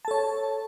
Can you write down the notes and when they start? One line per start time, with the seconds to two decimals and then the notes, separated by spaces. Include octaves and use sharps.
0.05 A5
0.08 A4
0.11 C#5